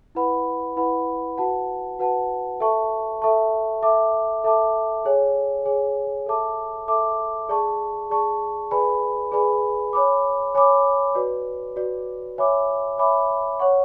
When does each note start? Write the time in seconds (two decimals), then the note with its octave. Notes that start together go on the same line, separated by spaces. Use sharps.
0.15 E4 B4 F#5 B5
0.76 E4 B4 F#5 B5
1.38 F#4 B4 F#5 A5
1.99 F#4 B4 F#5 A5
2.60 A4 E5 A5 C#6
3.22 A4 E5 A5 C#6
3.83 A4 E5 A5 D6
4.44 A4 E5 A5 D6
5.05 G#4 C#5 G#5
5.66 G#4 C#5 G#5
6.26 A4 E5 A5 D6
6.88 A4 E5 A5 D6
7.49 G#4 D5 A5 C#6
8.10 G#4 D5 A5 C#6
8.71 G#4 B4 D5 G#5 B5
9.32 G#4 B4 D5 G#5 B5
9.93 C#5 G#5 B5 D6
10.55 C#5 G#5 B5 D6
11.15 F#4 B4 D5
11.76 F#4 B4 D5
12.38 C#5 E5 G#5 B5 D6
12.98 C#5 E5 G#5 B5 D6
13.59 C#5 F#5 C#6